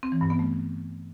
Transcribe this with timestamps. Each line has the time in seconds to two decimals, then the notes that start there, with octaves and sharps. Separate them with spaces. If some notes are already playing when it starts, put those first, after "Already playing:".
0.03 C4
0.12 E3
0.21 G2
0.30 B3
0.39 A3